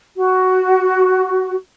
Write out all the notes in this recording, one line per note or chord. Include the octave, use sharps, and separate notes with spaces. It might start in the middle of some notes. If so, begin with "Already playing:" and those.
F#4